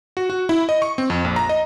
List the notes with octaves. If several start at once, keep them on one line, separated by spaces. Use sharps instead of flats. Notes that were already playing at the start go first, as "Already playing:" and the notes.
F#4
F#4
E4
D#5
C#6
C4
F2
A#1
A#5
D#5